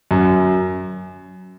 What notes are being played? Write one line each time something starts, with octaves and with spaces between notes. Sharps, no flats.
F#2